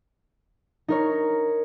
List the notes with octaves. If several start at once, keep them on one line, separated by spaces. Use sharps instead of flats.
D#4 A#4 C#5